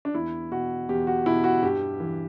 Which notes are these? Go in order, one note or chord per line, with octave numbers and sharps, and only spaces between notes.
D4
E2 E4
B2 F#4
E2 G4
F#4
B2 E4
F#4
G2 G4
E3